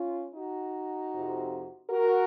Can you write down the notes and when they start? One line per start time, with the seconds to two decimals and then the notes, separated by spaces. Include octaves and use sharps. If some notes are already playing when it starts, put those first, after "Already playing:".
Already playing: C#4 F4
0.35 D#4 F#4
1.13 F2 C3 F3
1.90 F#4 A#4